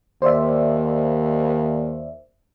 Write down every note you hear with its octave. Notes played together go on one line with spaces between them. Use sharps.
D#2 C5 D5 E5